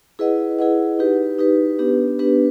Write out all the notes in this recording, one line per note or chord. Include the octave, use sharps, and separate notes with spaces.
E4 G#4 B4 D#5 F#5
E4 G#4 B4 D#5 F#5
D#4 G4 B4
D#4 G4 B4
B3 D4 G4 B4
B3 D4 G4 B4